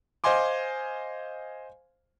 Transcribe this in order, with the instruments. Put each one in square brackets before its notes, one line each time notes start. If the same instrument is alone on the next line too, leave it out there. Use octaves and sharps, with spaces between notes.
[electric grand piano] C5 D#5 F5 G#5 C6 D6